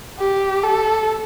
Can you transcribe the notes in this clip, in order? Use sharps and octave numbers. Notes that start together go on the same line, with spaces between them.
G4
A4